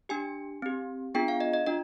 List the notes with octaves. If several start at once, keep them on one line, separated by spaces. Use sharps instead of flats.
D4 G4 G#5
C4 G4
B3 D4 F4 G#4 G5
F5
D#5
D#5
D4 F4 D#5